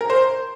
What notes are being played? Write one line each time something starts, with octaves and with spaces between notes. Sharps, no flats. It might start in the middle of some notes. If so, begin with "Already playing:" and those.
A#4
C5